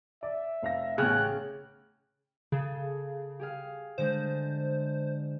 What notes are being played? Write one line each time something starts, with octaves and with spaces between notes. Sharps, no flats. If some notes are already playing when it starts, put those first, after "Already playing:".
D5 E5
F1 F5 A#6
A1 C#3 G5 F6 F#6 G#6
C#3 G#4 A4
G4 G#4 F5
D3 G#3 D4 C5